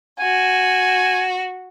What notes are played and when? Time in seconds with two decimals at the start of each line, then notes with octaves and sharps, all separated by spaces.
0.19 F#4 G#5